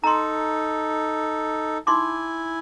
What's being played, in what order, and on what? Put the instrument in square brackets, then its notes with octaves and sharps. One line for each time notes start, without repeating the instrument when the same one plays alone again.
[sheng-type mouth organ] D#4 A4 [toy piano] A#5 C6
[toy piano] D#4 C6 D6 [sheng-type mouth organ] E4 G#5